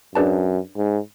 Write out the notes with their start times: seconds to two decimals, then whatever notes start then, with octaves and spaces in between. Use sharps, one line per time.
0.15 F#2 D4 G#4 B4 D5 A5
0.77 G#2